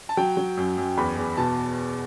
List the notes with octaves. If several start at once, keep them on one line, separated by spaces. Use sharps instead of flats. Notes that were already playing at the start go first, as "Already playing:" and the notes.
A5
F#3 G5
F#3
F#2
F#2
E2 B5
E2
B2 A5